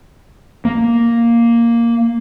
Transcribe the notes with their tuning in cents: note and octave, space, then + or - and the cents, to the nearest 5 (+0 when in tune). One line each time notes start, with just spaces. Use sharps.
A#3 +0